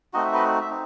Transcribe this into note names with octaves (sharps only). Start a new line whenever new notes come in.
A3 C4 D#4 F#4 D#5
E5
B4 D#5
E5
C4 D#4